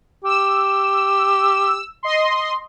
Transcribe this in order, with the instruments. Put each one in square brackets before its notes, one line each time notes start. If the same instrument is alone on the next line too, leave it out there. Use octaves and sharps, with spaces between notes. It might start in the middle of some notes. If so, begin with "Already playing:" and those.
[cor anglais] G4 [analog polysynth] E6
[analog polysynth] D#5 C6